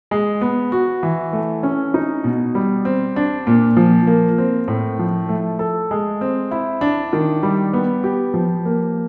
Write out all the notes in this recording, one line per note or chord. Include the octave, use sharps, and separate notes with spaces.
G#3
B3
F#4
E3
A3
C#4
D#4
B2
G3
C4
D4
A#2
F3
A#3
C4
A2
F3
A3
A4
G#3
C4
E4
D4
D#3
G3
B3
G4
F3
A#3